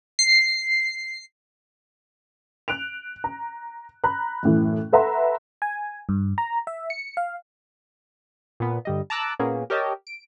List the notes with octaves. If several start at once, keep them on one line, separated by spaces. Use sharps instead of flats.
C7
F#6 D7 F7
A#5
A#5 B5 F#6
F#2 A2 E3
A4 B4 E5 F#5 A#5 C6
G#5
G2
A#5
E5
C#7
F5
A#2 B3
G1 G3 D#5
A5 A#5 D6 E6 F#6
A#2 A#3 B3 C#4 G#4
G4 A#4 C#5 D#5 A5
D7